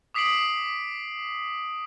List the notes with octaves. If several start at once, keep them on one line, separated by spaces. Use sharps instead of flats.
D6 D#6 B6 C7 D7 F#7